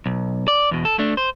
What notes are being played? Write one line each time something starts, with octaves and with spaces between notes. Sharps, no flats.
B1
D5
E2 B2
A4
A3 D4
C5